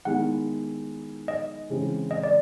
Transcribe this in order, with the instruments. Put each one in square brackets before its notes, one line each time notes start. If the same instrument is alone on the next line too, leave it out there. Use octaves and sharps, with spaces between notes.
[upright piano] D#3 G#3 B3 E4 [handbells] F#5
[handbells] D#5
[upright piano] C#3 E3 G#3 C4
[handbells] D#5
D5